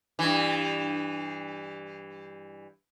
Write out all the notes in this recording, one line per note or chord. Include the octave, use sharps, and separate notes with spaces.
G2 E3